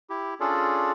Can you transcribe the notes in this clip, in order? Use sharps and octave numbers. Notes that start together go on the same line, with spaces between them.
E4 G4
C#4 D4 F4 G#4 A4 D5